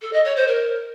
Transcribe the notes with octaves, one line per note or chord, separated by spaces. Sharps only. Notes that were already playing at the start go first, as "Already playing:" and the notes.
A4
D#5
C#5
C5
A#4